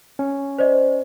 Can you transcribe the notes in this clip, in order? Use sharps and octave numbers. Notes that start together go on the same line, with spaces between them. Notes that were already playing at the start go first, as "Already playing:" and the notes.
C#4
C5 D5 D#5